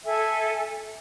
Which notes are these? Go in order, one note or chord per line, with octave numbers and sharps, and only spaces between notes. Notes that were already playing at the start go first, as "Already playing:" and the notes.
A4 E5 G#5